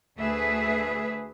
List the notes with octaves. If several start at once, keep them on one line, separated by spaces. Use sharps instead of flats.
D2 A3 G#4 B4 E5